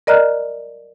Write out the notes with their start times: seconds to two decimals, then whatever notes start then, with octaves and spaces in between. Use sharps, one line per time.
0.07 A#4 D5 D#5 A#5 F6 F#6